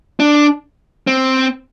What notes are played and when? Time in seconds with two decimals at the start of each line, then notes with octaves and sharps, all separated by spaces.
0.20 D4
1.07 C4